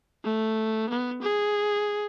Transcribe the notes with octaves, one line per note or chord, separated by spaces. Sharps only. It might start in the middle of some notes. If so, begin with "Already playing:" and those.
A3
B3
G#4